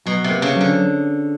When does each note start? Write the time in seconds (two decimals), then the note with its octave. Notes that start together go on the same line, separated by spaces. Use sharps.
0.06 B2 F#3
0.24 C3
0.30 A#3
0.42 C#3
0.55 F#3
0.61 D3